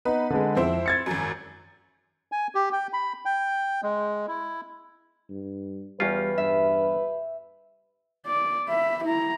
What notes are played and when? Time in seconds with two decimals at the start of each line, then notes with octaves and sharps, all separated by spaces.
0.05 B3 D#4 B4
0.30 D3 G#3
0.56 F2 C4 E4 C5
0.86 G#6 A6 C#7
1.06 G#1 F#2
2.32 G#5
2.55 G4
2.73 G5
2.93 B5
3.25 G5
3.83 G#3
4.28 E4
5.29 G2
6.00 E2 G3 C#4 F4 G4 B4
6.38 G2 E5
8.26 D5
8.68 E5 B5
9.04 E4 A#5